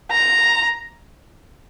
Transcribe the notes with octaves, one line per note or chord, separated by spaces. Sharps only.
A#5